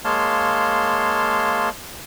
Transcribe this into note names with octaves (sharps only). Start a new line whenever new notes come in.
G#3 A#3 C#5 F5 A5 C6